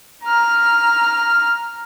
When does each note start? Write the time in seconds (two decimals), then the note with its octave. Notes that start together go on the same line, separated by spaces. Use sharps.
0.24 A#5 F6